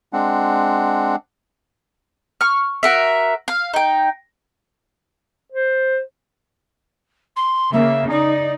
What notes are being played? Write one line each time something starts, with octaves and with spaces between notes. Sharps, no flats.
G#3 C4 D4 F#5
C#6 F6
F#4 A#4 E5
F5
D#4 G5
C5
C6
C#3 A#3 E5
D#4 D5